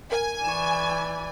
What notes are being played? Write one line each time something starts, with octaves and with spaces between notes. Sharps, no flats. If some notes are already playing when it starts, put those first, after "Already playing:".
A#4 G#5
E3 D5 C#6 E7